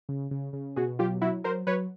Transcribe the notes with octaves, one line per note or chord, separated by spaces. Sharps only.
C#3
C#3
C#3
B2 F#4 G#4
F#3 F4 G4
F#3 E4 F#4
F#3 A#4 C5
F#3 B4 C#5